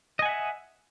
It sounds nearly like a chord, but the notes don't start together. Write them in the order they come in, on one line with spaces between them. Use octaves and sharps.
D#5 G#5 F#5 E5